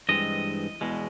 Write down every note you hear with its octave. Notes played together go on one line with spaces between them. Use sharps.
G2 E3 G#3 C4 D#5
E2 B2 G#3